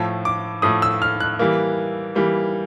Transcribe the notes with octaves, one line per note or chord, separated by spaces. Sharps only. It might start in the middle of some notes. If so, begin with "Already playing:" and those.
Already playing: A2 F3 A3
D6
A2 F3 A3 D#6
E6
F6
F#6
E3 G3 A#3
E3 G3 A#3